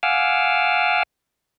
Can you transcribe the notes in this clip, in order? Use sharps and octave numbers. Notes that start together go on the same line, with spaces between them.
F5 F#5 G#5 D6 E6 F6